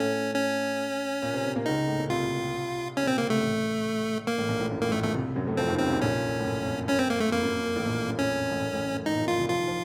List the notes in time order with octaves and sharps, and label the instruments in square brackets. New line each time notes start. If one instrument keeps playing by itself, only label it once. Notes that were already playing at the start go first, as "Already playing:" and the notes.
Already playing: [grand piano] A2 A3 [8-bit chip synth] C#4
[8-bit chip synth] C#4
[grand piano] A#2 A#3
C3 C4
C3 C4
A#2 A#3
[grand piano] C#2 C#3 [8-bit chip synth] D#4
[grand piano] A2
A#2
[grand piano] C2 C3 [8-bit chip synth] F4
[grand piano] C2 C3 [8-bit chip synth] C#4
[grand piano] A#2
[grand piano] C2 C3 [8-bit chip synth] C4
[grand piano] C#2 C#3 [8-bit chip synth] A#3
[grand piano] C2 C3 [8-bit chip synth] A3
[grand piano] A1 A2
[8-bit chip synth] A#3
[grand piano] A1 A2
A#1 A#2
A1 A2
F#2
[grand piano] A1 A2 [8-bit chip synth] A#3
[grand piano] A1 A2 [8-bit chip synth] A3
[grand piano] A#1 A#2 [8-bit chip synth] A3
[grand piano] C2 C3
F#2 F#3
A2 A3
[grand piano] F2 F3 [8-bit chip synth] C4
[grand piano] D#2 D#3
[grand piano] C#2 C#3 [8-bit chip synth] C4
[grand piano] C2 C3
[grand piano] A#1 A#2 [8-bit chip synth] C#4
[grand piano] A2
F#2
F2
[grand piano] F#2 [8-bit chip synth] C#4
[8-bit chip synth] C4
A#3
A3
[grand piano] F2 [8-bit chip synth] A#3
[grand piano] F#2
F#2
F#2
A1 A2
A#1 A#2
F#2
[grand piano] F2 [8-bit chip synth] C#4
[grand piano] F#2
A1 A2
F#2
A1 A2
F#2
F#2
[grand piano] A1 A2 [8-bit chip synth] D#4
[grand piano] A#1 A#2
[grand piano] A#1 A#2 [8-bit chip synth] F4
[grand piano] C2 C3
[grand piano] F3 [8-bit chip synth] F4
[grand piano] D#3
F3